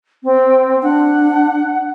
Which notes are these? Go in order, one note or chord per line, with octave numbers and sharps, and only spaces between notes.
C4
D4 F#5